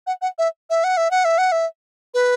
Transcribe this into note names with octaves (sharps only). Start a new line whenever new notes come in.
F#5
F#5
E5
E5
F#5
E5
F#5
E5
F#5
E5
B4